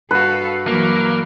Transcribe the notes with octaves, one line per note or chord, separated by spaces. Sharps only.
G2 F#4 A4 B4 F5
E3 F#3 A#3